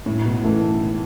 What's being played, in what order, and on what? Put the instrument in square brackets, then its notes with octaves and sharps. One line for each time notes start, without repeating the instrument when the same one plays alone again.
[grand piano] A2 [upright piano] E4
[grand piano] B2
[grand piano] E3 [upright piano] A3